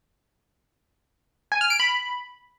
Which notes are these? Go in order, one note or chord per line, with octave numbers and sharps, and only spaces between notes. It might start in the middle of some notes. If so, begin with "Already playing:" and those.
G#5
F6
D7
B5